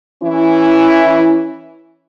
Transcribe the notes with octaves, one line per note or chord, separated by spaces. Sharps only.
E3 C#4 E4